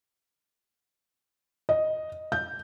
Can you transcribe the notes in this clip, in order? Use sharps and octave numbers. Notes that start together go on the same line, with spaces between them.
D#5
G6